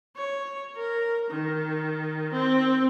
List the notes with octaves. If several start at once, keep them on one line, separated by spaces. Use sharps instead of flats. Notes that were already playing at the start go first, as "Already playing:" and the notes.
C#5
A#4
D#3
C4